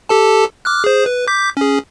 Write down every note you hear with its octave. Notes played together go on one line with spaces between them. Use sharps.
G4 A4 A5
D6 F6 F#6
G#4 C5
B4
D6 G6 B6
C#4 G#4